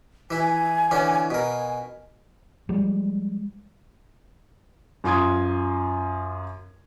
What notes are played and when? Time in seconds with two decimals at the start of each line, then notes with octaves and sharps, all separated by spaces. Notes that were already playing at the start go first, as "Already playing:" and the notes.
0.31 E3 E4 G#5
0.91 D3 E3 C#4
1.30 B2 A#4 G#5
2.69 F3 G3 G#3
5.04 F#2 F4 C6 D#6 G#6